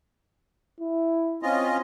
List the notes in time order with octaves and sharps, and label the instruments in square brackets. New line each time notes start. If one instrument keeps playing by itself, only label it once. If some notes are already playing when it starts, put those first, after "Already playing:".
[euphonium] E4
[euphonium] C4 [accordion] C#4 F4 D#5